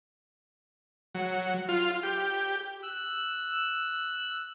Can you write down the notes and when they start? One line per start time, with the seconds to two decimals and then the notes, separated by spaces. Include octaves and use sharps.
1.15 F#3
1.69 F4
2.03 G4
2.83 E6 F#6